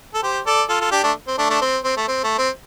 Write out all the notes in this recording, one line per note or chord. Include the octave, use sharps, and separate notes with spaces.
A4
G4 C5
A4 D5
F4 A4
F4 A4
D4 G4
A3 D4
C4
A3 D4
A3 D4
C4
C4
A3
C4
A3
C4